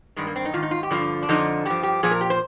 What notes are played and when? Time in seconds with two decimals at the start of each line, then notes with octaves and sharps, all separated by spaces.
0.16 G2 D#3 G#3
0.27 A#3
0.36 C4
0.45 D#4
0.53 G#2 D#3 F4
0.63 D#4
0.71 F4
0.83 G4
0.91 G2 D3 F3 F4
1.23 D4
1.29 F2 D3 F3 D#4
1.66 G2 F3 G4
1.83 G4
2.03 A#2 F3 G#4
2.11 A#4
2.21 G4
2.30 C5